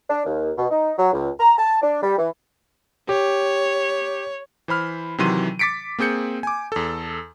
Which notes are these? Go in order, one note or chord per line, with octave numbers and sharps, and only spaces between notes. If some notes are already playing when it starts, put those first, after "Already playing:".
D4
D#2
B2
D#4
F#3
C#2
A#5
A5
D4
G3
E3
G4 C#5
E3 C5 B5 F6
C3 D#3 E3 F#3 C6 D#7
D6 A6 B6 C#7 D7
A#3 C4 G#4 G6 C#7
G#5 D6
E2 A4